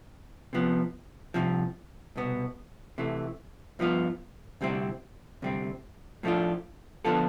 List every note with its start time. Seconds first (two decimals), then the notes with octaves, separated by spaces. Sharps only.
0.53 C3 F3 B3
1.34 C2 C3 F3
2.16 C2 B2 B3
2.98 C3 E3 A3
3.79 G2 F3 B3 F4
4.61 D2 C3 G3 C4 E4
5.42 D2 C3 G3 C4
6.23 A2 F3 A3 D4 F4
7.05 D3 F3 B3 F4 A4